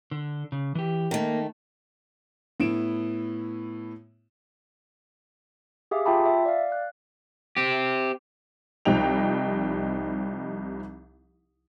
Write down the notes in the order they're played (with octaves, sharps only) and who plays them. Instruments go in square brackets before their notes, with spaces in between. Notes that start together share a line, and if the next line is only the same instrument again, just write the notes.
[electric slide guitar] D3
C#3
E3 G4
[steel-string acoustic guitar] D#3 A3 [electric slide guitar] A#3
[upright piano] A2 B3 E4 D7 E7
[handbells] G4 G#4 E5 F5 D6
F4 E5 G5 A5 B5
E5
D5 F5
F#6
[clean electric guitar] C4 G4
[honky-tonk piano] C2 F3 G3 D#4 G5 F7